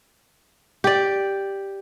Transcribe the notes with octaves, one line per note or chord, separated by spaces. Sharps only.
G4 D5